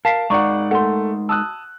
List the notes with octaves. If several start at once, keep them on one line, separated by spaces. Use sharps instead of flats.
A#4 F5 A5 B6 C7
G#3 D#4 A#4 D5 F#5 A#5 C#6
A3 F#5 C6
A5 D#6 E6 F#6